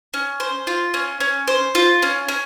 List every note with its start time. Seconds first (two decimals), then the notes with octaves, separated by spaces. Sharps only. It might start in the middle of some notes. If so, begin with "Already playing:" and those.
0.14 C#4
0.40 C5
0.67 F4
0.94 C#4
1.20 C#4
1.48 C5
1.75 F4
2.02 C#4
2.29 C#4